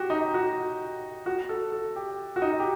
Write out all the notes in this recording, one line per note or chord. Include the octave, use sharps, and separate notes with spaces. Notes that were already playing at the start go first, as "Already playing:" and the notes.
Already playing: F#4 G4
D#4
F#4
F#4
A4
A4
G4
F#4
D#4
G4